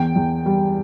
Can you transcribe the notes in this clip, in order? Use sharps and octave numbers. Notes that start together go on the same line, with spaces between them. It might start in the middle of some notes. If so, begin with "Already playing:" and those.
Already playing: E2 G5
E2
G3